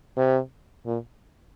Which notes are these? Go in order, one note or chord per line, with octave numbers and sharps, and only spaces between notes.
C3
A#2